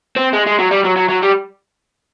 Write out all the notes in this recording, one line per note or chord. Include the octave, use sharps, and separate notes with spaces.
C4
G#3
G#3
F#3
G3
F#3
F#3
F#3
G3